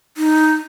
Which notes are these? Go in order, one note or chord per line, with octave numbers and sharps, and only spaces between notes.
D#4